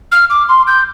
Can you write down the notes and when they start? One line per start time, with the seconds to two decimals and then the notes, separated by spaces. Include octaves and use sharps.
0.11 F6
0.30 D6
0.49 C6
0.67 G6